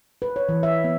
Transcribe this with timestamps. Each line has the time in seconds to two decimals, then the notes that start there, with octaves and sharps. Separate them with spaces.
0.22 B4
0.36 C#5
0.49 E3
0.63 E5
0.84 B3